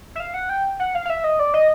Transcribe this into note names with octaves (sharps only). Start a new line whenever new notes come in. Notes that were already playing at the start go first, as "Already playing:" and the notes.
E5
F5
F#5
G5
F#5
F5
F5
E5
D#5
D5
D#5